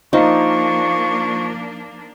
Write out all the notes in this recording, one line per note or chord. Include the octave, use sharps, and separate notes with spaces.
F3 A#3 D4 D#4 F4 C5 F5 C#6